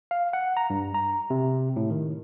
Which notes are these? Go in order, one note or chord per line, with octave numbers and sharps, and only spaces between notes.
F5
F#5
A#5
G2
A#5
C3
A2
D#3